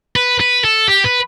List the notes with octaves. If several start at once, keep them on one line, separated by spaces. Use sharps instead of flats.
B4
B4
A4
G4
B4